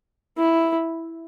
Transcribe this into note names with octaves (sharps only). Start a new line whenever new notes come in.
E4